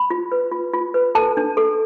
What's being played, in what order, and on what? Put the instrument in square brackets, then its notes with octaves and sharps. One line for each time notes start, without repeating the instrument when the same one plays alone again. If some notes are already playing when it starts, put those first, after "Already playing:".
Already playing: [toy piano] B5
F4
B4
F4
F4
B4
A4 A5
D4
A4